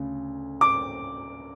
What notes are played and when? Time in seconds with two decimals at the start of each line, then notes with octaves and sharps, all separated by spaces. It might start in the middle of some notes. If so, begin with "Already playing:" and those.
Already playing: D2 C#3
0.61 D6